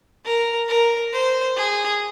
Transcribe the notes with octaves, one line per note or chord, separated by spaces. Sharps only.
A#4
A#4
C5
G#4